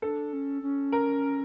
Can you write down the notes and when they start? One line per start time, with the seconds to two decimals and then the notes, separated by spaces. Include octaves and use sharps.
0.02 D4 A4
0.32 C#4
0.62 C#4
0.92 A#4